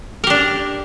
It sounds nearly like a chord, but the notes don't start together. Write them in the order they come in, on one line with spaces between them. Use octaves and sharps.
A#4 G4 D4